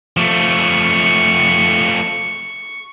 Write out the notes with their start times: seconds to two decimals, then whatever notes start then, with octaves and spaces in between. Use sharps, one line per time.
0.17 F3 A3 C#6